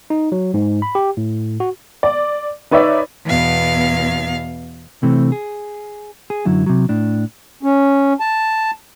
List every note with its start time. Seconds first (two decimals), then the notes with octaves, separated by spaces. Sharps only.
0.10 D#4
0.32 F#3
0.54 G#2
0.82 B5
0.95 G4
1.17 A2
1.60 F#4
2.03 D5
2.71 D#4 B4 C#5 D5 E5
3.25 E2 B2 F5
5.03 C3 E3 A3 C4
5.32 G#4
6.30 G#4
6.45 F#2 D3 F#3 E4
6.66 C3 F#3
6.89 A2 D4
7.63 C#4
8.20 A5